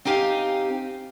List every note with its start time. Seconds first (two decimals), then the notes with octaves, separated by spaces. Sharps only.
0.05 C4 D#4 G4 F5 G5 G#5